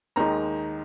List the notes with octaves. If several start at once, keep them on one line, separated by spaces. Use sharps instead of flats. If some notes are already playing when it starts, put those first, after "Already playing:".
D#2 D#3 G#3 D#4 A#5